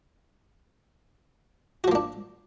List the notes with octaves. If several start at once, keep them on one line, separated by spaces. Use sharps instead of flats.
F3 A#3 D4 F#4